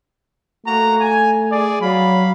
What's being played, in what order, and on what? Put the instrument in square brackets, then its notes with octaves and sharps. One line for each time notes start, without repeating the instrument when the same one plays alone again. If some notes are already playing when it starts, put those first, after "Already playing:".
[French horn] A3 [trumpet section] A#3 F#4 A#5
[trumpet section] G#5
G#4 D5
[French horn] F#3 [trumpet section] F5 B5